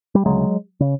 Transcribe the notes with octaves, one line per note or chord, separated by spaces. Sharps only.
G3
D2 C#3 F#3 G#3
C#3